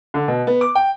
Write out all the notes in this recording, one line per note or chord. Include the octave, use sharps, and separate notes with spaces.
D3
B2
B3
D6
G5